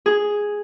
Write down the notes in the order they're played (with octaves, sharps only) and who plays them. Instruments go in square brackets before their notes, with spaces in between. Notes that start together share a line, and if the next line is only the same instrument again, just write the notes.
[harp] G#4